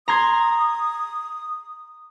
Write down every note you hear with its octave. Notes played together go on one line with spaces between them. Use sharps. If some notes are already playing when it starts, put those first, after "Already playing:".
A#5 C6 D#6 G#6